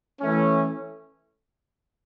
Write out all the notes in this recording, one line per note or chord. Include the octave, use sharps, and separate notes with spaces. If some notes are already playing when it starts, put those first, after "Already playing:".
E3 A3 C#4